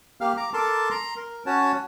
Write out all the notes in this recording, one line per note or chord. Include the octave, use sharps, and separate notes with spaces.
A#3 G4 F5 F6
A#5 D6
A4 A#4 A5 C6 D6
A#5 C6
A#4
C#4 F#4 C#5 A5